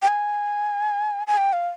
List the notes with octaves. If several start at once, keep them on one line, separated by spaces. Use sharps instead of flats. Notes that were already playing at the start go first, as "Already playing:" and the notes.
G5
G#5
G#5
G5
F5